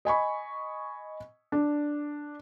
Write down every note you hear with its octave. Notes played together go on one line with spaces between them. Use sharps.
D#5 G#5 B5 C#6
D4